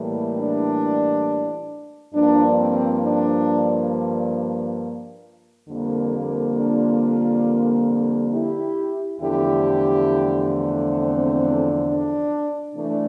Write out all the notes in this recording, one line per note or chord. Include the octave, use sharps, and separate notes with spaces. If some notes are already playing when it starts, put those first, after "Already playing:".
Already playing: A2 E3 G3 A#3
D4
G2 F3 A#3 D4
C4
D4
F2 D3 G3 A#3
D4 F4
E4 G4
E2 D3 F3 A3 E4 G4
C4
D4
C3 E3 A3 D4